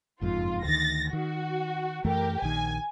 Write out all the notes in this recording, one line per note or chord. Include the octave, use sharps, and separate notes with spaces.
F#1 F2 G#2 F4
D2 D#3 A6 A#6
D#3 F#4
F#2 E3 A3 G4 A#4
A#1 D#3 G#5